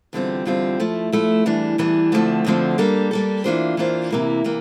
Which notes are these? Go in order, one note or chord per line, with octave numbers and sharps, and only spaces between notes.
E2 D3 G3 C4 F4
E2 D3 G3 C4 F4
F3 A3 E4
F3 A3 E4
E2 E3 G3 D4
E2 E3 G3 D4
D2 D3 F3 A3 C4
D2 D3 F3 A3 C4
G3 A#3 D4 A4
G3 A#3 D4 A4
E3 A#3 D4 F4 C5
E3 A#3 D4 F4 C5
C3 E3 A#3 E4
C3 E3 A#3